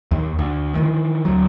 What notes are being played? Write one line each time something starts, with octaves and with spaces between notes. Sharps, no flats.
D#2
D2
D#3 E3
D2 F#3